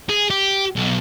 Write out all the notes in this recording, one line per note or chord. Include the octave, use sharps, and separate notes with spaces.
G#4
G4
B1